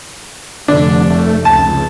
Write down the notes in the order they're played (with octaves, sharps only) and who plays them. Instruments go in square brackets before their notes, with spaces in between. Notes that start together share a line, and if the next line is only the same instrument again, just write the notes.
[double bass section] F1 [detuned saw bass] D3 [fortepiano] D4
[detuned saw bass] A3
[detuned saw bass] C#2 [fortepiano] A5